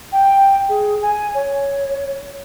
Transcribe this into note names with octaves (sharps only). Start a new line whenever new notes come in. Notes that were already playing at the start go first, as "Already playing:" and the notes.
G5
G#4
G#5
C#5